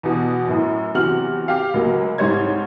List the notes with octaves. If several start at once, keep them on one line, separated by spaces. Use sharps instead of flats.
E2 B2
F#2 A2
E2 C3 F#3 F#4 F6 F#7
G4 F5
C#2 F#3 A#3
C2 G#2 G3 C5 C#5 G#6